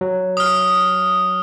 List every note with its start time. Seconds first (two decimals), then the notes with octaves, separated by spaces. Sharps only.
0.01 F#3
0.37 D#6 F6